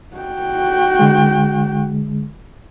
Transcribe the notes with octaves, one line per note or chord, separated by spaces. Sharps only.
F#4 G5
D3 G#3